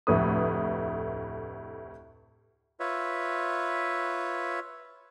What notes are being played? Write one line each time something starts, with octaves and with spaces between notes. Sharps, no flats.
F1 D2 A2 B4 D#6
F4 B4 C#5 E5